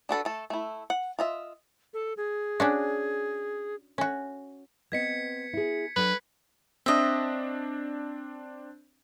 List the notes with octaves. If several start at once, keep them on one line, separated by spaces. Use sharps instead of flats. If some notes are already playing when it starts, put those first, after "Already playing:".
D4 F#4 A4 B4
A3 A4
A3 E4
F#5
F4 D#5 E5
A4
G#4
C#4 D4 F#4
C#4 F#4
B3 C4 D#5 G#6 B6 C#7
E4 G#4
F#3 D4 A4 B4
C4 D4 D#5 E5